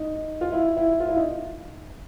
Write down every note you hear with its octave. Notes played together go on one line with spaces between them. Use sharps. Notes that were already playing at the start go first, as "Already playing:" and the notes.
Already playing: D#4
F4
E4
E4
F4
E4
D#4